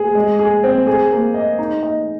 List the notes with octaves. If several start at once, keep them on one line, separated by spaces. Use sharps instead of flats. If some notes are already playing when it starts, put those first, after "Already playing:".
Already playing: G#4
G#3
G#4
C4
G#4
A#3
D#5
D#4
D#5